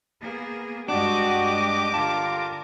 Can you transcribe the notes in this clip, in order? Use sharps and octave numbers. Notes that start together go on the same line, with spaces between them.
A#3 B3 G#4
G2 G#3 D4 F#4 G4 D#5 D6
D3 F4 A#4 A5